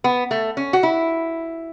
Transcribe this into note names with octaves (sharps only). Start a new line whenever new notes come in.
B3
A3
C#4
F#4
E4